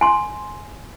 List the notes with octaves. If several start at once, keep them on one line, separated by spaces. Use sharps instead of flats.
G#5 C6